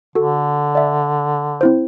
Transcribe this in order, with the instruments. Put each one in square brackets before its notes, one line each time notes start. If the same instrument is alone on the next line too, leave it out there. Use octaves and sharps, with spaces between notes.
[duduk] D3 [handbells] F#4 A4
[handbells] D5 E5
C4 E4 C5